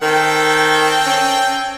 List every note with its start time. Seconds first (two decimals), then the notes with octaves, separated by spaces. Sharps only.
0.02 D#3 C4 A4 G5
1.06 C#4